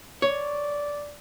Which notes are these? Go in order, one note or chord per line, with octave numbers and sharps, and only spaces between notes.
C#5 D5